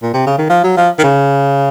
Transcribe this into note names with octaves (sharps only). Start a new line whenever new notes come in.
A#2
C3
C#3
D#3
F3
F#3
F3
D#3
C#3